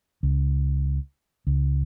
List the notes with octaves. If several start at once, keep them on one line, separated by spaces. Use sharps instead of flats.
C#2
C#2